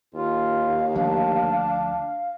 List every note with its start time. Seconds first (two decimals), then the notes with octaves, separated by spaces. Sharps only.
0.15 D#2 F4 F5
0.95 D2 F3 A3 D4